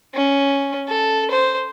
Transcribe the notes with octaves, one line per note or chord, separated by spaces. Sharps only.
C#4
A4
C5